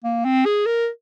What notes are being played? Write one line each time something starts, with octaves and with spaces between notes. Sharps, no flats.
A#3
C4
G#4
A#4